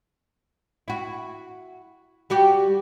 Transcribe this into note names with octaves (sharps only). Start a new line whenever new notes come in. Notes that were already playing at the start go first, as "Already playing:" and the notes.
E4 F#4
G3 F#4 G4